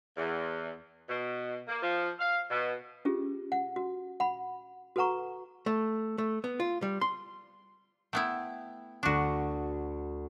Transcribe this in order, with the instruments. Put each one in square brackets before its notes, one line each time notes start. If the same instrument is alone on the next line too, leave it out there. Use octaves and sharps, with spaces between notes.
[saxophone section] E2
B2
A#3
F3
F5
B2
[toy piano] C#4 F4 G4 G#4
F#5
F#4
F#5 B5
F#4 A4 B4 F#5 A#5 C#6
[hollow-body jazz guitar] A3
A3
B3
F4
G3
C6
[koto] A3 B3 E4 [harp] G5
[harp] D2 C#6 [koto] D4 F#4